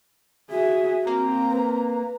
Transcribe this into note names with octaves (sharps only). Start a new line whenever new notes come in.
F#4 G#4 E5
A#3 C4 A#5
B4